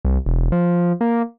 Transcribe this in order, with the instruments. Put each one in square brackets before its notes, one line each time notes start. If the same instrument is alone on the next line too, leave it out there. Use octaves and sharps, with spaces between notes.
[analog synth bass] C2
E1
F3
A#3